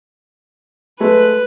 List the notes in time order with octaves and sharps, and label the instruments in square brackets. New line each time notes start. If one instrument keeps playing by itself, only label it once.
[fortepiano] G#3 A3 [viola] B4